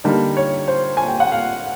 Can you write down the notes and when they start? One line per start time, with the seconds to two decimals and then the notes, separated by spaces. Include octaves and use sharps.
0.04 D3 G3 A#3 D#4
0.37 C#5
0.68 C5
0.97 G#5
1.08 G5
1.20 F#5
1.32 F5